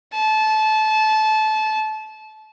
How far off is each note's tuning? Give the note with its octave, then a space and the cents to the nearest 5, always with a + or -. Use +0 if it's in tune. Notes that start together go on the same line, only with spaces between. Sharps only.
A5 -25